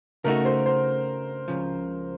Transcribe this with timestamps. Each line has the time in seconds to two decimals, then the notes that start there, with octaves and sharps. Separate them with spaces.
0.24 C#3 A3 D#4 F#4 A#4
0.45 C5
0.66 C5
1.48 C#2 C#3 F3